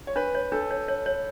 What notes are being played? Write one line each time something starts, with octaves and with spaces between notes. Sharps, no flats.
C#5
D4 B4
C#5
D4 A4
C#5
C#5
C#5